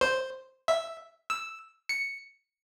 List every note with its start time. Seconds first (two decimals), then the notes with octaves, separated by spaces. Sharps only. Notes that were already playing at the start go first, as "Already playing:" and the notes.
0.01 C5
0.68 E5
1.30 E6
1.89 C#7